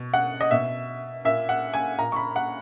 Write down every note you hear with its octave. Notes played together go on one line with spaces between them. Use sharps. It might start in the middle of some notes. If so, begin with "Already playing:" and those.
Already playing: B2
F#5
D#5
B2 E5
A#2 E5
F#5
G#5
A#2 A#5
C#6
B5
F#5